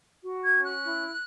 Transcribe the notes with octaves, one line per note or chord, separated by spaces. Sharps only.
F#4
G#6
C#4
F#6
E4